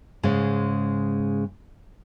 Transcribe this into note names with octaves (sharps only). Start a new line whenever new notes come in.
G#2 C#3 G#3